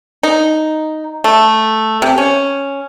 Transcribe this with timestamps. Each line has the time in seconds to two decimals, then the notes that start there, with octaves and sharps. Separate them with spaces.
0.23 D#4
1.24 A3
2.02 C3
2.18 C#4